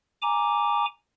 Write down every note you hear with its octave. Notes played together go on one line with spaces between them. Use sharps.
G#5 A#5 D6